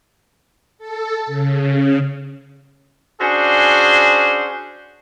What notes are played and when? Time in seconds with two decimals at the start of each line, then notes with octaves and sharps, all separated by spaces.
0.78 A4
1.26 C#3
3.20 C#4 D4 F#4 G#4 C5